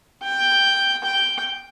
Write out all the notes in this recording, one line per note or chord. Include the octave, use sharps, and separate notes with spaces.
G5
G5